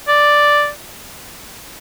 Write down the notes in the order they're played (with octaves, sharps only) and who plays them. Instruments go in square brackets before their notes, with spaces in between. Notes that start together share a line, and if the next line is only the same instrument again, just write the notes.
[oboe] D5